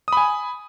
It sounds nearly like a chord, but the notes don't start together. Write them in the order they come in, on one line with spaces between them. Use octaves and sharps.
D#6 B5 G#5